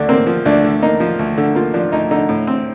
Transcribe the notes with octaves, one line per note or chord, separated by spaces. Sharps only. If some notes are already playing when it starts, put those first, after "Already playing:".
Already playing: D2 D3 D4
A#3 C4
F3
D2 D4
D3
A#3 D#4
F3
D2
D3
A#3 F4
F3 D4
D2 D#4
D3 D#4
A2
C4